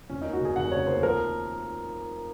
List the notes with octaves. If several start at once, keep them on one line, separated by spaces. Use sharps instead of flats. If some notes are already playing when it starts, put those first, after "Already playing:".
F1 C#4
D#2 D#4
F#4
F1 G#4
F1 F#5
C#3 C#5
D#2 C5
F3 A#4